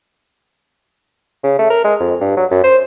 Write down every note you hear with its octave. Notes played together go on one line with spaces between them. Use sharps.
C#3
A3
A#4
G#3
F2
G2
F#3
F#2
C5